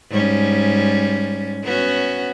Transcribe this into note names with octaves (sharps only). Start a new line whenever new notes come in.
G#2 G3 C#4
B3 C#4 F#4